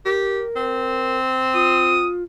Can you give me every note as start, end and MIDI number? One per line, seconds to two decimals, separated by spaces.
0.05 0.42 67
0.05 1.18 70
0.56 2.10 60
1.54 2.23 65
1.54 2.07 87